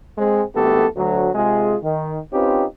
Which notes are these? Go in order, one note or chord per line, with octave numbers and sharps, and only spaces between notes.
G#3 C4
G#1 G2 A3 B3 G4 A4
D2 F#3
C3 G#3 F4 G#4
D#3
C4 C#4 D#4 F4 G4 B4